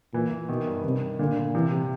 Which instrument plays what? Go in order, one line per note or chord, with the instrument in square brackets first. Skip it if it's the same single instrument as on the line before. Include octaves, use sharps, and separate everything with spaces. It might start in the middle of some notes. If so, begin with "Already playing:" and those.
[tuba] A#2 [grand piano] E3
[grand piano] E3
[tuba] B2 [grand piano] D#3
[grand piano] G2
[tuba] C3 [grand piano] D#3
[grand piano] D#3
[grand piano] A#2 [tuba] D3
[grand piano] A#2
[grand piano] C3 [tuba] E3
[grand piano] C3